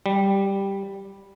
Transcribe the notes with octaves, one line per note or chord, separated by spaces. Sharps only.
G3